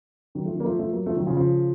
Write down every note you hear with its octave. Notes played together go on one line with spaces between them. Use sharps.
D#3 F#3
F3 A3
D#3 F#3
A#3
F3 A3
F3 A3
F#3 A#3
F3 A3
D#3 F#3
C#3 F3
C#3 F3